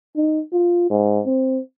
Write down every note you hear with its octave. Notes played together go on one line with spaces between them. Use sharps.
D#4
F4
G#2
C4